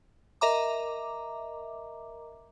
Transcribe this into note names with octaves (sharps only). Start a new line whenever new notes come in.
A#4 D#5 E5 A#5 D6